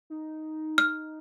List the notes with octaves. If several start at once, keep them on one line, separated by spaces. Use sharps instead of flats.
D#4
F6